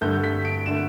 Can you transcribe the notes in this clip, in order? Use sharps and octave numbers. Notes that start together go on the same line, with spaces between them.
G2 D3 A3 G6
B6
D7
D3 A3 E7